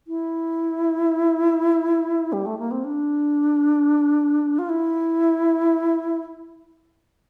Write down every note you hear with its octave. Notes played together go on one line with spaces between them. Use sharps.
E4
G3
A3
A#3
C4
D4
F4
E4